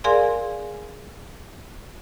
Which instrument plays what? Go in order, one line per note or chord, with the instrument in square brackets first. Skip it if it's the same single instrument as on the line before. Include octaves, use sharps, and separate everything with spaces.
[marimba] G#4 A#4 D5 F5 G#5 C6